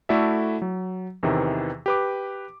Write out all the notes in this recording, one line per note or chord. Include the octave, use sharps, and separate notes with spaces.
A3 E4 F#4 A4 D5 E5
F#3
E2 C3 D#3 E3
G4 B4 D6